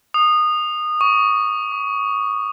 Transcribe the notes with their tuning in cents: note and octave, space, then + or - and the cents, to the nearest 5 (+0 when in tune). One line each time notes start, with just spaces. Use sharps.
D#6 -20
C#6 +20
D6 +35